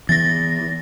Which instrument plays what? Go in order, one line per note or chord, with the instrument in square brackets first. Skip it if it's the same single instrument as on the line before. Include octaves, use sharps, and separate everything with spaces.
[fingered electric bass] E3 B3 [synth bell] A6 A#6